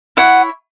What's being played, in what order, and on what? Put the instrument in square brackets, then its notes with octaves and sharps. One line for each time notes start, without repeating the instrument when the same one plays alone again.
[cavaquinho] E4 C#5 F#5